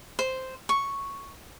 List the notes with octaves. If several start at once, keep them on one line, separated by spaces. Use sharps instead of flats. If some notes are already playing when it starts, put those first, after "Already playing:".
C5
C#6